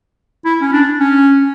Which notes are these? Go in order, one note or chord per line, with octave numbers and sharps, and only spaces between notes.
E4
C#4
D4
C#4